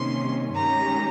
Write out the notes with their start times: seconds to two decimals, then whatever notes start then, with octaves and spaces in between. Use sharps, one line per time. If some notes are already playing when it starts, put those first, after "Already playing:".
Already playing: C3 D#3 G3 A#3 C#4 C6
0.54 G2 D#3 G#3 C#4 G4 A#5